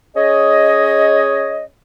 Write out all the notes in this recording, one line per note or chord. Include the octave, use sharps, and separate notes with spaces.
C#4 G#4 C#5 D#5